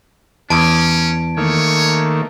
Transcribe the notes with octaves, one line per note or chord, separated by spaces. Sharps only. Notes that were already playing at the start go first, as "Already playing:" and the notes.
E2 C#4 A5 D7
D#3 A3 A#3 C#5